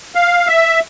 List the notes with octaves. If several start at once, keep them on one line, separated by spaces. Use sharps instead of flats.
F5
E5